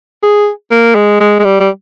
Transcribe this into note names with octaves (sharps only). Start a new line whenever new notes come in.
G#4
A#3
G#3
G#3
G#3
G3
G3